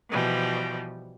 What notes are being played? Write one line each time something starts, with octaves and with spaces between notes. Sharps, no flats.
B2 E3 F3 G3